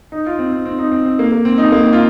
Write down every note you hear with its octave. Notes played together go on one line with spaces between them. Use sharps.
D#4
F4
C4
C4
C4
D#4
C4
C4
A#3
A#3
C4
D#4
A#3
F4